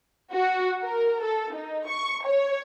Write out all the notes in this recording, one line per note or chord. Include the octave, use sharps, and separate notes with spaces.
F#4
A#4
A4
D#4
C#6
C#5